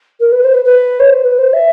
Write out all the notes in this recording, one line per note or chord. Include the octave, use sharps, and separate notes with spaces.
A#4
B4
C5
B4
B4
C#5
C5
B4
C5
E5